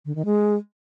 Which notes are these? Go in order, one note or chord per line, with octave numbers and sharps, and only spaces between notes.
D3
D#3
G#3